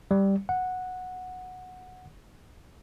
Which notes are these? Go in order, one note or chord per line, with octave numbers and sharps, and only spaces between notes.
G3
F#5